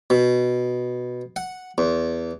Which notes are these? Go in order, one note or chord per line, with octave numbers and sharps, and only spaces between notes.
B2
F#5
E2